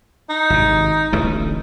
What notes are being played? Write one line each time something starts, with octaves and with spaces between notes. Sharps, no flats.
D#4
G#1 C3
D1 A1 B2